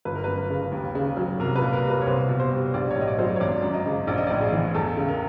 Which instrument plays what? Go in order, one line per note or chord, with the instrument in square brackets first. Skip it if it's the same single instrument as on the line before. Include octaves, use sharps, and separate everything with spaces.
[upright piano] G1 B4
A#4
F#2 B4
C#3
D#2
C#3
F#3
C2 A#4
B4
A#2
A#4
G3
B4
C#5
C2 C5
B2
C5
G3
A#1 D5
C#5
A2
D#5
D5
F#3 C5
C#5
C#5
G#1 D5
F#2
D#5
C#3
A#1 D5
D#5
A2 D5
G#4
E3
E2 A4
C#3
A#4